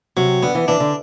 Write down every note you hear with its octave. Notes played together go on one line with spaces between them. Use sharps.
C3 F#3
D3 B3
E3
E3 D4
D3